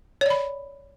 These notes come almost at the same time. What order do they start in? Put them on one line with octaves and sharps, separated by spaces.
C#5 D5 B5